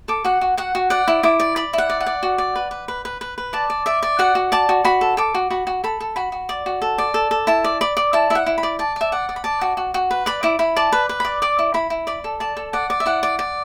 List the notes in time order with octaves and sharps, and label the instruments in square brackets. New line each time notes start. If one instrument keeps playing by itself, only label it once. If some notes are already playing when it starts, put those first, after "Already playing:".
[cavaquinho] A4 D6
F#4 F#5
F#4
F#4 F#5
F#4
D5 F#5
E4
E4 D6
D5
D5 B5
E4 F#5
D5
F#5
D5
F#4
D5
B4
B4
B4
B4
B4
B4
D5 A5
D5
D5 E5
D5
F#4 F#5
F#4
D5 A5
F#4
F#4 B5
A4
A4 D6
F#4
F#4 B5
F#4
A4 B5
A4
F#4 B5
F#4
D5
F#4
A4
D5
A4
A4
E4 A5
D5
D5 B5
D5
E4 A5
E4 E5
F#5
E4
B5
D5
D5 A5
D5 E5
D5 F#5
D5
B5
D5 A5
F#4
F#4
F#4
B4
D5 B5
E4 D6
E4 B5
D5 A5
B4
B4
D5 B5
D5 D6
E4
E4 B5
E4
D5 B5
A4
D5 A5
A4
D5 F#5
D5
E5
E4 F#5
D5
D5